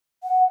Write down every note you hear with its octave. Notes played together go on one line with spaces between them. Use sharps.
F#5